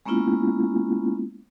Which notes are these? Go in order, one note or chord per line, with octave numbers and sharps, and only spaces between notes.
G#3 A#3 B3 C#4 E4 F4